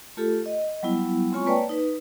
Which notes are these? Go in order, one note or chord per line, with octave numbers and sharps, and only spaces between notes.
A3 F4 G4 A4
D#5
F#3 G3 B3 E4
G#3 C4 F4 C#5 G#5 C#6
A#3 B4 C#5 D5 G5 A5
D#4 B4